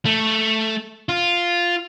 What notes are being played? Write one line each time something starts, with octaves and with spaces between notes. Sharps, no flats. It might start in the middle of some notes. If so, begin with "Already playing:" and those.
A3
F4